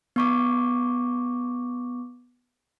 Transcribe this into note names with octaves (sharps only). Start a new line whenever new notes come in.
B3 C#6 D6